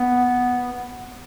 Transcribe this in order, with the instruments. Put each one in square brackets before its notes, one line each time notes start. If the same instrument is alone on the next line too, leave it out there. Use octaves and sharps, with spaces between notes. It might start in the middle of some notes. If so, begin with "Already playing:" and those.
Already playing: [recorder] B3